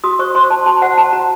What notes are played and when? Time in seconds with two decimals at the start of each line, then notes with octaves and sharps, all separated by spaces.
0.04 F#4 D#6
0.19 C5 C#6
0.35 C5 C6
0.50 F#4 A5
0.66 F#4 A5
0.82 C5 F#5
0.97 C5 A5
1.13 F#4 A#5